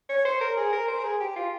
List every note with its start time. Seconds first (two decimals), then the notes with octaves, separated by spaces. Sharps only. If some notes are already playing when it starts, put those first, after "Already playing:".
0.09 C#5
0.25 C5
0.41 A#4
0.57 G#4
0.73 A#4
0.88 C5
0.99 A#4
1.04 G#4
1.20 G4
1.36 F4